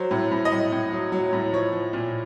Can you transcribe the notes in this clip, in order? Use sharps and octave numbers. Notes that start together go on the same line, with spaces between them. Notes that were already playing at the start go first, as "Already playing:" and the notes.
Already playing: F#3 C5
A2
A2
D#5
A2
A2
F#3
F#3
A2
F3 C#5
F3
A#2